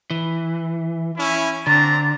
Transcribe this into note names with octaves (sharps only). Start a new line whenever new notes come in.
E3
C#4 E4
D3 C4 D4 A#5 A6